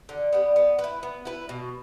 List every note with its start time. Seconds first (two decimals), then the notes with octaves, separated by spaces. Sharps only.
0.09 D3
0.33 G3 B3
0.56 B3
0.79 B4
0.84 E4
1.03 B3
1.25 E4 B4
1.49 B2